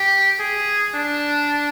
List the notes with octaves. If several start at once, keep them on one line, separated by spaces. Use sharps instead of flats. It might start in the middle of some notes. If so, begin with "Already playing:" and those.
Already playing: G4
G#4
D4